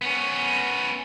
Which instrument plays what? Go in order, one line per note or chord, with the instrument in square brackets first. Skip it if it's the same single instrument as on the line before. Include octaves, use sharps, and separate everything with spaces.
[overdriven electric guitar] B3 C#4